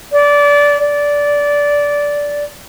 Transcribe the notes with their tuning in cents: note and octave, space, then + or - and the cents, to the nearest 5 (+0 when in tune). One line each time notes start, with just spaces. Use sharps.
D5 -20
D5 -15